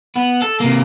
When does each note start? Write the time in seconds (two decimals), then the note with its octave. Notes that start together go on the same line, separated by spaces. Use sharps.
0.16 B3
0.42 A4
0.60 C3 A#3